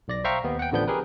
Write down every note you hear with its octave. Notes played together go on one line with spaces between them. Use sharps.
B1 D5 A#6
C5 E5 F5 G5 A#5 C#6
D#2 B3
F#5 G5
A1 D3 F3 B3 D4 G6
G4 G#4 A#4 B4